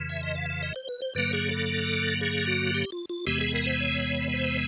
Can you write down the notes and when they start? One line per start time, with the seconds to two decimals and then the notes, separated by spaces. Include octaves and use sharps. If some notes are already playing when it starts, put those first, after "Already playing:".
Already playing: F2 C#3 E3
0.09 E5
0.23 D#5
0.36 F5
0.50 F5
0.63 D#5
0.76 C5
0.89 B4
1.02 C5
1.15 G2 D3 F#3 A#3 B4
1.33 G#4
1.51 A4
2.21 G#4
2.47 F#4
2.74 G4
2.92 F4
3.09 F4
3.27 E2 C3 E3 G#3 B3 G4
3.41 G#4
3.54 A#4
3.67 C5
3.80 C#5
4.33 C5